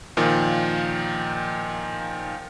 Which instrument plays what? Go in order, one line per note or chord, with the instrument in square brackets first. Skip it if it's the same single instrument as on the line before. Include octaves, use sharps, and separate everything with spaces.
[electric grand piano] A#2 D#3 F3